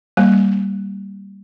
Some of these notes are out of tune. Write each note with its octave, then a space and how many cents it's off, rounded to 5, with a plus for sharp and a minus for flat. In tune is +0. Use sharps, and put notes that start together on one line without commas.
G3 +0 A#3 +0